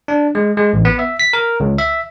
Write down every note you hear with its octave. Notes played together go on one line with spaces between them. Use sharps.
D4
G#3
G#3
A1
B3
E5
B6
A#4
C#2
E5